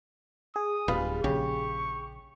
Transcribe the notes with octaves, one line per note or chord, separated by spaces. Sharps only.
G#4 D#6
D1 G3 F4 B4
A#1 C#3 G4 C#6